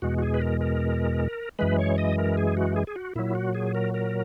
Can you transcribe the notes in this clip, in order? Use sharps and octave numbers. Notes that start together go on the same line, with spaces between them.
E2 B2 G#3 F#4
F#4
G#4
B4
A#4
A#4
F#2 E3 G#3 B4
C#5
D#5
A#4
G#4
F#4
G#4
G#4
F#4
A#2 F#3 E4
F#4
G#4
A#4
A#4